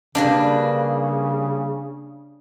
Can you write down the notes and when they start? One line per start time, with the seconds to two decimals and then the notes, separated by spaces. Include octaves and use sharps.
0.15 C#3 G3 A#3 D4 B4